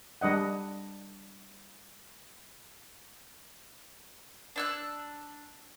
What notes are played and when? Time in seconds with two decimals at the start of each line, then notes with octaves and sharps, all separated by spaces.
0.21 G3 D4 D#5 F#5
4.56 D4 E6 F#6